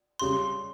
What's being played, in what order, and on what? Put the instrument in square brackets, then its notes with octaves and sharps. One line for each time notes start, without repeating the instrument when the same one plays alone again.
[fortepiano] C#3 G3 [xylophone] C6